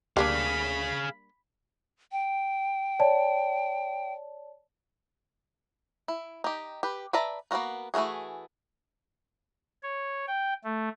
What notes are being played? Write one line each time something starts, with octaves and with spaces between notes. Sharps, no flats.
D2 G3 A#3 D4 G#4 F5 B5
G5
C#5 D5 A5
E4
D#4 G4
G4 B4
B4 D5 E5 A5 A#5
A#3 B3 C#4 F#4 A#4
E3 A3 F4 F#4 G#4
C#5
G5
A3